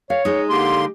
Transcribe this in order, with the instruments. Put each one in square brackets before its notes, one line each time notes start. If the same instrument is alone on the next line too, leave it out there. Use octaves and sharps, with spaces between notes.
[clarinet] C#5 [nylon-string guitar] F5
[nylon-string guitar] G#3 D#4
[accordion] D3 A#3 C6 [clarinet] G4